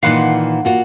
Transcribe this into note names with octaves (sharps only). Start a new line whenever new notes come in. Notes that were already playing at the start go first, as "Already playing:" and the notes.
A#2 D#3 E3 F5 F#5 C6
A#3 F4 F#4